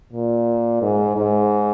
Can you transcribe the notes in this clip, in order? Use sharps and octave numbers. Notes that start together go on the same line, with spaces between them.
A#2
G#2
G#2